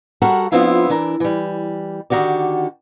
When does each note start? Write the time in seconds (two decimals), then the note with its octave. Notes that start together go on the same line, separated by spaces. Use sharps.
0.22 G3 F#4 A4 A#4 C#5 F#5
0.52 F3 B3 C4 D4 E4 F4
0.90 E3 D4 A#4
1.20 E3 G3
2.10 D3 D#3 F#4 G4 D5